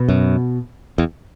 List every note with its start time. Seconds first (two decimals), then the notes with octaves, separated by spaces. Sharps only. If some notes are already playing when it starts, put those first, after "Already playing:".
Already playing: B2
0.08 F#2
0.98 E2